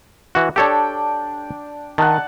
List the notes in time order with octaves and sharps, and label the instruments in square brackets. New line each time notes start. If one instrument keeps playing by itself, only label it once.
[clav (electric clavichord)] E3 F#4
[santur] D4 D5 G5 [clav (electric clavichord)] G4 A4 C#5
[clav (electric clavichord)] D#3 [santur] F#5 A5